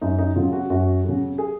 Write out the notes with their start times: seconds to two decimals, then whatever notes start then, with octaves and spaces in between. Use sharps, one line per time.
0.01 F#2 D#4
0.18 D#4
0.36 C#3 F#3 F4
0.53 F#4
0.70 F#2 F#4
1.04 C#3 F#3
1.38 G#4